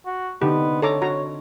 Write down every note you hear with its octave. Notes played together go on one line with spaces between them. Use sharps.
F#4
D3 B3 C4 D#4 G4
A4 C#5 A#5 D6
F#4 A#5